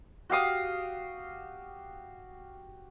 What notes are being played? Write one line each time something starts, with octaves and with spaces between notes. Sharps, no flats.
F#4 G4 F5 D#6